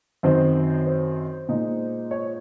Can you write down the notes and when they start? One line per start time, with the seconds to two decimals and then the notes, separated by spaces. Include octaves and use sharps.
0.23 F#2 D#3 F#3 C4 C5 D#5
0.86 C5
1.49 A#2 G#3 D#4
2.11 C#5